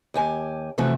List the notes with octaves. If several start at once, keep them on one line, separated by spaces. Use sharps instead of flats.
D#2 G4 G#5
C3 E3 F3 A3 F#4